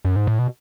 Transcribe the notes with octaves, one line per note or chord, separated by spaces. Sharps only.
F#2
G#2
A2
B2